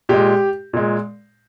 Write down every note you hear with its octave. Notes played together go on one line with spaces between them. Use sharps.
A#2 G#3 G4
A#2 G#3